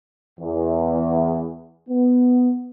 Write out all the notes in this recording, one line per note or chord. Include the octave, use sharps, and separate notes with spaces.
E2
B3